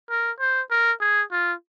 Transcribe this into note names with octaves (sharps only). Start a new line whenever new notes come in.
A#4
C5
A#4
G#4
F4